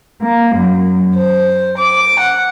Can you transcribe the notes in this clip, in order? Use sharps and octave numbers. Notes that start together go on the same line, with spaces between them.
A#3
F#2
C5
D6
F#5